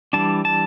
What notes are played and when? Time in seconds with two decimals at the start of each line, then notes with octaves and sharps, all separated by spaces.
0.13 E3 G3 D4 A5
0.45 A5